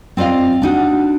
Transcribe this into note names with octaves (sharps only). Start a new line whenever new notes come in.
C4 F4 D5 D#5 F5
D4 D#4 F#4